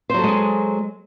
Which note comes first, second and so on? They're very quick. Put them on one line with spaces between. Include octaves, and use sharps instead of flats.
C5 F#3 A4 G#3 G#4